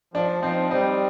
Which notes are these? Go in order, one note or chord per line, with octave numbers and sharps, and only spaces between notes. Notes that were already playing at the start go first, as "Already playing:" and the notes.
F3 D4
F3 C4 D#4
G3 C4 D#4